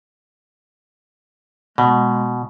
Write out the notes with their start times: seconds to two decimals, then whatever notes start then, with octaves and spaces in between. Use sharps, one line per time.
1.78 B2 G#3